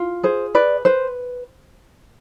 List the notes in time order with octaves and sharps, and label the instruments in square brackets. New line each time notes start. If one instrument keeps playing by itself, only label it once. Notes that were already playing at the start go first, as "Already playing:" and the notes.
Already playing: [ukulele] F4
G#4 C5
B4 D5
B4 C5